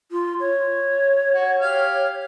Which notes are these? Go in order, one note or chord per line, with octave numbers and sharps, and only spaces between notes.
F4
C#5
F#4
G4 F5